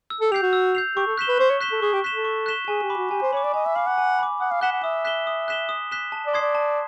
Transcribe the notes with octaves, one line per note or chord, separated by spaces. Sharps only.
E6
A4
G4 G6 C7 F7
F#4
E6
G6 C7 F7
G4 C#6
A4
F#6 B6 E7 G7
B4
C5 C#6
C#5
F#6 B6 E7 G7
A4
G#4 C#6
G4
F#6 B6 E7 G7
A4
C#6
F#6 B6 E7 G7
G#4 G#5
G4
B5 D6
F#4
G4 G#5
C5
C#5 B5 D6
D5
D#5 G#5
E5
F5 B5 D6
F#5
G#5
B5 D6
F#5 D#6
F5
F#5 F#6 B6 E7 G7
F#5
E5 D#6
F#6 B6 E7 G7
D#6
F#6 B6 E7 G7
D#6
F#6 B6 E7 G7
A5
D5
C6 D#6 G#6 C7
D5
A5